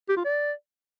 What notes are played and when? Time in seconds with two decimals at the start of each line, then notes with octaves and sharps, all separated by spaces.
0.09 G4
0.17 F4
0.25 D5